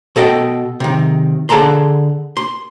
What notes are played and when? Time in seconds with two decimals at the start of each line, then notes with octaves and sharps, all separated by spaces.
0.16 B2 A4 D#5 G5
0.80 C3 D#3
1.49 D3 G#4 A4 A5 A#5 C6
2.37 C6